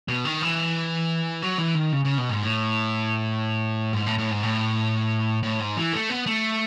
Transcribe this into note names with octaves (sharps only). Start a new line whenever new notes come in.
B2
D#3
E3
F#3
E3
D#3
C#3
C#3
B2
G#2
A2
G#2
A2
A2
G#2
A2
A2
G#2
E3
A3
B3
A3